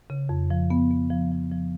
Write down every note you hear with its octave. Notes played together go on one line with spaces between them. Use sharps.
C#3
F2
F3
B3
B3
F3
F3
F3